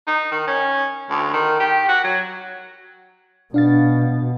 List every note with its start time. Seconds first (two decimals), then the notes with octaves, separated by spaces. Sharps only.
0.07 D#4
0.32 D#3
0.47 C#4
1.10 D2
1.33 D#3
1.60 G4
1.89 F#4
2.04 F#3
3.54 B2 D4 F5 A6